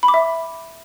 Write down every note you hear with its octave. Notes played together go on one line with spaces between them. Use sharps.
B5
D6
E5